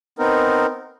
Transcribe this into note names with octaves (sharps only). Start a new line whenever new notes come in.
B3 C4 D#4 A#4